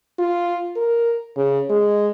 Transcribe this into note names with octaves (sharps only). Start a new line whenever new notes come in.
F4
A#4
C#3
G#3